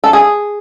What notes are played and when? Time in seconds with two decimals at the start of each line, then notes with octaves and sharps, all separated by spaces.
0.04 A4
0.13 G#4